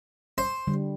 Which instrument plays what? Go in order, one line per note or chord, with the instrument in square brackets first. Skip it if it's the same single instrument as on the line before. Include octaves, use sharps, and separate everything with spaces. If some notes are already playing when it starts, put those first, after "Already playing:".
[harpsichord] C5
[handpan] D3 G3